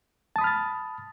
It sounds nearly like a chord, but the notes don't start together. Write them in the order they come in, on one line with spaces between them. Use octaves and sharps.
A5 D#6 B5 F6 A6